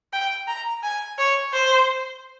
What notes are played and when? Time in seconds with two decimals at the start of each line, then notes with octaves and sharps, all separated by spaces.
0.13 G5
0.48 A#5
0.83 G#5
1.18 C#5
1.53 C5